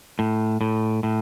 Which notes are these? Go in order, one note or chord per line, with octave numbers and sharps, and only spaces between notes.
A2
A2
A2